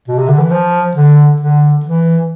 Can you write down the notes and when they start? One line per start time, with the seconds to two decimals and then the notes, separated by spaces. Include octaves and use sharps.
0.08 B2
0.18 C3
0.28 D3
0.39 E3
0.51 F3
0.95 D3
1.40 D3
1.85 E3